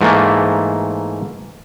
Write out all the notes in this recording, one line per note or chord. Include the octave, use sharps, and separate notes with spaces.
G#2 E3 A3 A#3